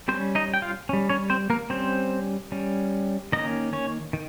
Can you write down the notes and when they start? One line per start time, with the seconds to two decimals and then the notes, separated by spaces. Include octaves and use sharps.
0.08 G3 C4 C5
0.12 C#4
0.35 D#4 D#5
0.54 G5
0.62 F4 F5
0.89 G3 C#4
1.09 C#4 C#5
1.30 C4 C5
1.50 A#3 A#4
1.70 G3 C4 C#4 C5
2.52 G3 C#4
3.32 D#3 A#3 C#4 D#4 D#5
3.73 C#4 C#5
4.13 D#3